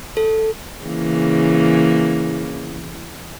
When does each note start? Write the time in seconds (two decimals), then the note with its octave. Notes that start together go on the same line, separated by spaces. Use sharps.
0.17 A4
0.85 C#3 E3 A#3